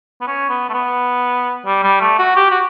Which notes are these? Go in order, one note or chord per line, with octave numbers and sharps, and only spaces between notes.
B3
C#4
B3
A3
B3
G3
G3
A3
F#4
G4
F#4